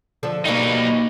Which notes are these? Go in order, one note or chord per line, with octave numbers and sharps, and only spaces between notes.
D3 F3 A4
B2 G3 A#3 D#4